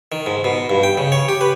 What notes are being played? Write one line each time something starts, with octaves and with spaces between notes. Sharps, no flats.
D#3
G#2
B2
G2
G5
C#3
C#5
G4
B4